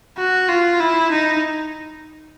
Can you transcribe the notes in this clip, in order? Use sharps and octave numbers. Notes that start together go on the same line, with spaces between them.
F#4
F4
E4
D#4